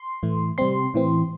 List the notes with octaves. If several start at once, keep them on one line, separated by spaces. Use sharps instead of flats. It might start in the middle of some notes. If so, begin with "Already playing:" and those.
Already playing: C6
A2 E3 A3
C3 G3 C4 C6
A2 E3 C4